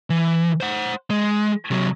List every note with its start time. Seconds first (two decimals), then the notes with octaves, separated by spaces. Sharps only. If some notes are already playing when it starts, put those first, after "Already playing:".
0.10 E3
0.61 C5 F#5
1.10 G#3
1.71 C3 F#3